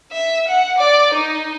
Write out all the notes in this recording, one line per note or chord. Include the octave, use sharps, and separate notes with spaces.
E5
F#5
D5
D#4